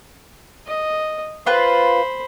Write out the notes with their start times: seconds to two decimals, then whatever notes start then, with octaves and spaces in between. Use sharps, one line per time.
0.66 D#5
1.46 F4 B4 C5 B5